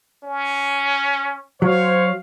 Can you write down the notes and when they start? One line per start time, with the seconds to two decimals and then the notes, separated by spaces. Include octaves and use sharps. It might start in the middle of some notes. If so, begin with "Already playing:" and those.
0.24 C#4
1.62 F#3 C5 C#5 F5